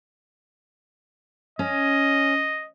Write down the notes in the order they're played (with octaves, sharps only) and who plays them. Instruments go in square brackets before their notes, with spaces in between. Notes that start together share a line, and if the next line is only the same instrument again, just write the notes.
[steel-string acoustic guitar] C#4 [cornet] D#5